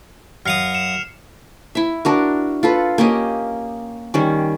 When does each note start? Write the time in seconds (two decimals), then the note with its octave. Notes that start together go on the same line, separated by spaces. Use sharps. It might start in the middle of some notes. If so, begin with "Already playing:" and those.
0.46 F#2 F5 D#6 F6 C7 C#7
0.74 C#7 E7 F7
1.75 E4 E5
2.05 D4 F#4 A#4
2.63 F4 A4 B4
2.98 A#3 C#4 G4 D#5
4.14 D#3 G3 C#4